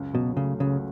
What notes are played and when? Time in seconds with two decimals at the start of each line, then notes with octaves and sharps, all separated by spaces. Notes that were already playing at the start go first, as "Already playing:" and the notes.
Already playing: C#2 F#2
0.14 B2 F#3
0.37 C#3 A3
0.60 C#2 C#3